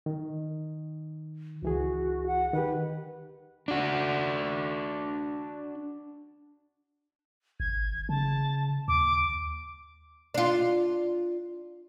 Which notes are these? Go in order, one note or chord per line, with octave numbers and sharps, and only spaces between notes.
D#3
C#2 E3 F#4 G#4
F#5
D#3 G4 B4
D4 F#4
G#1 G#6
C#3 A5
D#2 D6
D4 F4